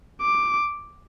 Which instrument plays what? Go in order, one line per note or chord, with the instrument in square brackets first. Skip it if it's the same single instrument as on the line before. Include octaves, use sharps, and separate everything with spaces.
[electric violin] D6